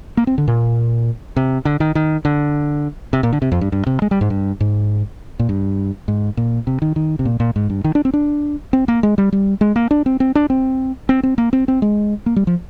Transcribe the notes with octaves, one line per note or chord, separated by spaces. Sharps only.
A#3
C4
D3
A#2
C3
D3
D#3
D#3
D3
C3
A#2
D3
C3
F2
G2
G2
C3
G#3
G3
G#2
G2
G#2
A#2
G2
G#2
A#2
C3
D#3
D#3
C3
A#2
A#2
G#2
G2
D#3
D4
C4
D4
C4
A#3
G#3
G3
G3
G#3
A#3
D4
C4
C4
D4
C4
C4
C4
A#3
C4
C4
G#3
A#3
G3
F3